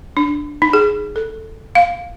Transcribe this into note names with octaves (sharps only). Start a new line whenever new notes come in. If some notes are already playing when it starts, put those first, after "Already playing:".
D4
D#4
G#4
A4
F5